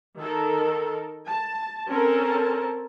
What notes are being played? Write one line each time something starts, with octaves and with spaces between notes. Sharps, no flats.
D#3 A4 A#4
A5
C4 C#4 A4 A#4 A5